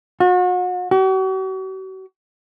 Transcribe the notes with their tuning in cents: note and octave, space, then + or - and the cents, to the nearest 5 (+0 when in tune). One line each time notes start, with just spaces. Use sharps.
F#4 -40
F#4 +45